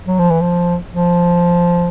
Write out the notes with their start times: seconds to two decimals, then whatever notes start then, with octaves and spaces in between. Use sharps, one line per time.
0.07 F#3
0.19 F3
0.31 E3
0.41 F3
0.92 F3